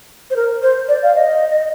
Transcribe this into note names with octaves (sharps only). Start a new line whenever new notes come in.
C5
A#4
C5
D5
F5
D#5